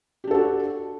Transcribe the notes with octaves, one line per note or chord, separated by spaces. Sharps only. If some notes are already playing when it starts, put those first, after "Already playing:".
D4 F#4 G4 A4